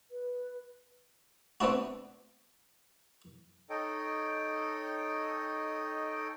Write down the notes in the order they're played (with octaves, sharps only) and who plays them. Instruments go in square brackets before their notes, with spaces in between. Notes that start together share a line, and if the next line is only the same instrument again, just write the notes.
[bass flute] B4
[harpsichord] B3 C4 D4 E4 F#4
[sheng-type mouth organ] D#4 A4 C#5 D#5 G5